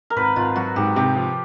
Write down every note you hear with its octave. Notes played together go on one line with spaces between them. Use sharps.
A#4
G#1 B4
G#1 F4
F#3 F#4
G#2 G4
C3 G4
F3